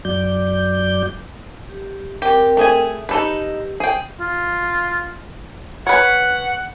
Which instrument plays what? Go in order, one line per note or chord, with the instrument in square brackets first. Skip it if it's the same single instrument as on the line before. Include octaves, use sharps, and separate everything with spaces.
[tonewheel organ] F#2 F#3 D5 G6
[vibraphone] G4
[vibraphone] C4 A#4 G5 [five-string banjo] G4
[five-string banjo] A3 G#4 G#5
[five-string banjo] D#4 A4 B4 [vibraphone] G4
[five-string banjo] G#4 G5
[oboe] F4
[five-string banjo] B4 C#5 [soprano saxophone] F#5